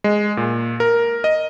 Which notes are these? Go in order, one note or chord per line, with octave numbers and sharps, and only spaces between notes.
G#3
A#2
A#4
D#5